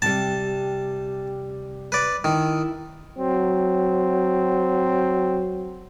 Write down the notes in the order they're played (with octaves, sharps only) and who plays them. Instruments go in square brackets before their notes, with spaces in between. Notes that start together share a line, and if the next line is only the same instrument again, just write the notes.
[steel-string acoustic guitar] C3 G3 [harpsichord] A5
[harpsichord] B4 D5
[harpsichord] D#3 [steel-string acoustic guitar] E4
[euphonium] F#3 [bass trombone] C4